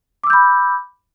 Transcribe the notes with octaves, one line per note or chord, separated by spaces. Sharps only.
B5 D6 E6 G6